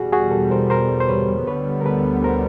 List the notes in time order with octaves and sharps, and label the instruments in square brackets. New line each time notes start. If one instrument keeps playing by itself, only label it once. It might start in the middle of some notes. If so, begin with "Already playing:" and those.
Already playing: [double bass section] E2 B2 G3 [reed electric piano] F#4 G#4
[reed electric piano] F#4 G#4
G4 A4
A#4 C5
A#4 C5
C5
B4 C#5
[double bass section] D2 D3 G3 B3 [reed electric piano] B4 C#5
[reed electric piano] A#4
A4 B4
A#4 C5